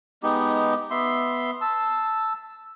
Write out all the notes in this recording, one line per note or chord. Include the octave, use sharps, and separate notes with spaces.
G#3 B3 D#4 G4
B3 E5 C6
A5 E6